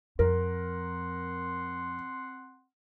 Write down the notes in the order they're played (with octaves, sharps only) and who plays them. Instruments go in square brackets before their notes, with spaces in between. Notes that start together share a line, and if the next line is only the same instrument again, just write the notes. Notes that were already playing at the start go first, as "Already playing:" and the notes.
[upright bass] F2 [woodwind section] C4 F#5 C6 [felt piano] A#4